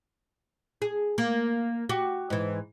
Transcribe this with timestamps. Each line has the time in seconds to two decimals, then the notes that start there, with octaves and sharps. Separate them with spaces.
0.82 G#4
1.18 A#3
1.89 F#4 G4
2.30 G#2 E3